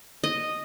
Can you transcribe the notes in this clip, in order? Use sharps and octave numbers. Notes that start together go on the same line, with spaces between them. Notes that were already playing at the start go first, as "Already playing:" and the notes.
D#5